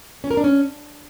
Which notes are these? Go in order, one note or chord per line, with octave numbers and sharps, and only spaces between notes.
C#4
A#4
D4
C#4